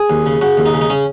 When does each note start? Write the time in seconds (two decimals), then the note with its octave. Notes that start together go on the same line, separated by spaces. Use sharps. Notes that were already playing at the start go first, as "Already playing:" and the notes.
Already playing: G#4
0.10 D#2
0.26 C#3
0.41 C#3 F#4
0.57 D#2
0.66 D#4
0.74 C#3
0.81 D#4
0.90 C#3 C#4